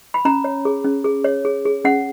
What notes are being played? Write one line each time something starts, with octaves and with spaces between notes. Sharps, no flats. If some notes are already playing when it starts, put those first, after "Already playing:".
B5
C#4 A#5
C#5
G#4
C#4
G#4
C#5
G#4
G#4
C#4 F#5